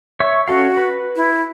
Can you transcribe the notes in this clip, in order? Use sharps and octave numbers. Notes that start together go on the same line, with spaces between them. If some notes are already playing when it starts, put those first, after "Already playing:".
C#5 E5 C#6
C#4 F#4 A4 F5
B4
E4